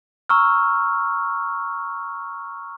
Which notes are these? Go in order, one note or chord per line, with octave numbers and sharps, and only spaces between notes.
A#5 C#6 E6 F6